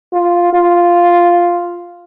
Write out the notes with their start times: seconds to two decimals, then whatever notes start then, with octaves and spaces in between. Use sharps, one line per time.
0.13 F4
0.53 F4